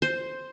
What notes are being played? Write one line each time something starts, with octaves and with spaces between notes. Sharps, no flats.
C5